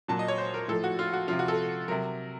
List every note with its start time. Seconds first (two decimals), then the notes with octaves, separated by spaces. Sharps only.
0.08 A#2 F#3 A5
0.19 D#5
0.28 C#5
0.38 C5
0.54 A#4
0.68 A2 F3 A4
0.84 F#4
0.99 F4
1.13 F#4
1.28 C3 F3 F4
1.39 F#4
1.48 A4
1.88 C3 F#3 A#4